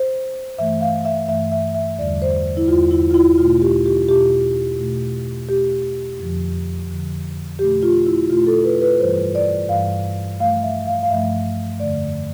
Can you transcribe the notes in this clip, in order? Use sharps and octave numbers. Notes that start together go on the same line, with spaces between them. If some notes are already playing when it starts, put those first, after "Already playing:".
Already playing: C5
G2 E3 A3 E5
F5
E5
G2 E3 A3 E5
E5
E5
E2 D3 G3 D5
C5
E4
E2 D3 G3 F4
E4
F4
E4
B2 A3 F4
G4
G4
B2 A3 G4
B2 A3
B2 A3 G4
F2 D3 F3
F2 D3 F3
B2 A3 G4
F4
E4
B2 A3 F4
A4
B4
B4
G2 E3 G3 C5
D5
G2 E3 G3 F5
G2 F3 A3 F5
E5
F5
F5
G2 F3 A3 E5
F2 D3 A3 D5